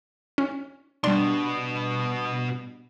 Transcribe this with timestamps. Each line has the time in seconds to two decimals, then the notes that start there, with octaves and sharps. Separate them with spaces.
0.38 C#4
1.04 B2 G3 D4 F#4 C6